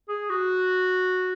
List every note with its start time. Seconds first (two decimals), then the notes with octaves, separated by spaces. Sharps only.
0.09 G#4
0.30 F#4